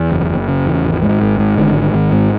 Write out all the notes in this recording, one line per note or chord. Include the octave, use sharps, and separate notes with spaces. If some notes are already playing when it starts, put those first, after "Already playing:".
Already playing: E2
F#1
F#1
C#3
E2
G#1
G#2
G#1
G#2
G#1 D3
G#2
G#1 D#3
G#2